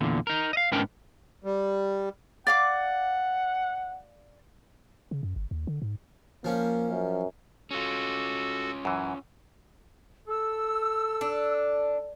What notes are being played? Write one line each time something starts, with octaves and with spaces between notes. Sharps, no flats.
E2 A#2 D3
D#4 A#4
D#5 F5
G#2 B3 C#4 D4 A#4 G5
G3
D5 F5 F#5 D6
C#3
F#2
G1
D#2
D3
G#2
F3 A#3 C#4
F#2
C#4 F4 F#4 A4
F#2 E3
A4 E6
D4